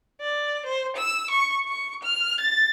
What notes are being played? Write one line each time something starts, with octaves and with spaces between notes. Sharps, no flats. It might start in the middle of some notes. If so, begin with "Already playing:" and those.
D5
C5
E6
C#6
C#6
F6
A6